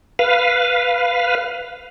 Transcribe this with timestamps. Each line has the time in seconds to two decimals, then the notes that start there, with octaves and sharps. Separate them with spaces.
0.19 B4 F5